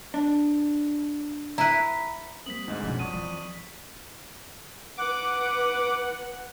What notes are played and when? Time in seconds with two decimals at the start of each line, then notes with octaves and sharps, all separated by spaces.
0.14 D4
1.58 E4 B4 A#5
2.46 G3 A#3 C4 D#6 B6 F#7
2.68 D2 G#2 D#4 D#5
2.83 F#2 B2 F3 C#4 F#5
2.99 F2 G3 D5 C#6 D#6 D#7
3.14 E3 F3
4.98 B4 F#5 D6